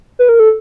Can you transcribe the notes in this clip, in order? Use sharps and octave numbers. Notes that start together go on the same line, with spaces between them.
B4
A#4
A4